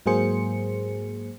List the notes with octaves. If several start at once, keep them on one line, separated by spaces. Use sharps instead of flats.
G#2 F#3 A#3 G#4 C5 C#7